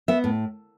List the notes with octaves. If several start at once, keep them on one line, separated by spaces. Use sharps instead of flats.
B3 E5
A2